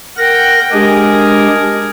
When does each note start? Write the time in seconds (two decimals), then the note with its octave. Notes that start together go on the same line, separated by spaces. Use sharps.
0.17 A#4 F#5 G5 A#6
0.72 G#3 D4 G4 G#4 A#4